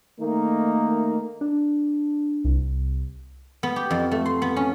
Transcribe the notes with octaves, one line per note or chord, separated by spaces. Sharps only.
D#3 A3 A#3 D#4
D4
C2
B3
G4
F2
A3
C6
B3
C#4